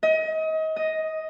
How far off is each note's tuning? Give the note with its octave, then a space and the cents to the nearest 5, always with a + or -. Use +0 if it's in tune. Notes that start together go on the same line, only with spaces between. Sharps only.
D#5 +30
D#5 +5